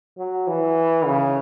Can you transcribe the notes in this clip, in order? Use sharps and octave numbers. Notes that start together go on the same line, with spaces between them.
F#3
E3
C#3